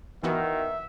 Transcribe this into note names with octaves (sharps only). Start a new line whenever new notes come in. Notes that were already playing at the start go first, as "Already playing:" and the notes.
D#3 E3 B3 F#4 E5